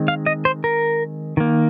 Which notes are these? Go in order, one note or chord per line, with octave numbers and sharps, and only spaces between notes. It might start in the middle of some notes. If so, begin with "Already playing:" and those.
Already playing: D#3 G#3 C4
F5
D#5
C5
A#4
D#3 A#3